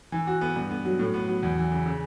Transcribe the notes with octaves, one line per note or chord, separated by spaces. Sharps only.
E3
F#4
B3
G2
B3
F#3
A2
B3
F#3
E2
E3
C#3
C#3